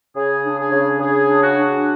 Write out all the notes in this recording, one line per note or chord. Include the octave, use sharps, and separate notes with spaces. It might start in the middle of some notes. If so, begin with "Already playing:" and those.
C#3 G#4
D4
G#4
C#3
C#3 G#4
D4
F#4
D4